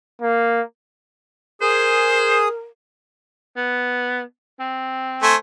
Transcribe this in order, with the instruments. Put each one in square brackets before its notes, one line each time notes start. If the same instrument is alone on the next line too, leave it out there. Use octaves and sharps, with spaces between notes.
[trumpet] A#3
[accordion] G#4 D#6 [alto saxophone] A#4 [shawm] C5
[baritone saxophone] B3
C4
[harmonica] A3 C5 G#5